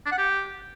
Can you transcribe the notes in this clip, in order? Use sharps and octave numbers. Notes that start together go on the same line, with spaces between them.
D4
F#5
G4